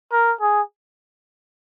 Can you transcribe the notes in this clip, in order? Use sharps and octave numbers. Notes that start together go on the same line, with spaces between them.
A#4
G#4